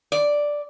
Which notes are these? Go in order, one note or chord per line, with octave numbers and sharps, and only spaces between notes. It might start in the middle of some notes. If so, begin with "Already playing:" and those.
D5